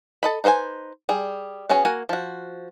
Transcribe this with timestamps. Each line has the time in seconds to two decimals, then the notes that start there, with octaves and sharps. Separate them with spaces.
0.23 A4 D#5 B5
0.44 D#4 B4 C5 G5 G#5
1.09 G3 G#4
1.69 B3 C#4 F#4 G#4 C#5
1.85 A#3 F#4 G#5
2.09 F3 F#4